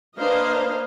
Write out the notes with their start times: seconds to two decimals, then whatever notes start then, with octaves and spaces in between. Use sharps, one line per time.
0.17 A#3 D4 B4 C5 D#5 F5